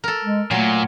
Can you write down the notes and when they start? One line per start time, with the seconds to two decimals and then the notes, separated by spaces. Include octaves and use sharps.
0.04 A4 A#4
0.25 G#3
0.51 A#2 F#3 A3 C6